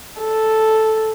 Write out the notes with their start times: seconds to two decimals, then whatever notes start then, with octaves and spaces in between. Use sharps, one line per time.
0.21 A4